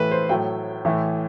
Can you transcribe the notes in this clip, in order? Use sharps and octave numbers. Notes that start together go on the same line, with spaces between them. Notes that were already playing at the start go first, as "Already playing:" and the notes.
Already playing: A2 E3 A3 A4 B4
C5
A2 F#3 A3 G5
A2 E3 A3